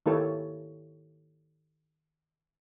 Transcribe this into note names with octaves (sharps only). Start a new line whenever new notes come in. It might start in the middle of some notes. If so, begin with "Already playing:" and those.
D#3 A#3 E4 G4 A4 C#5